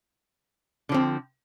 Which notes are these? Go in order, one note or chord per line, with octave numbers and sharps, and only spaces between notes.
D3 F3 C4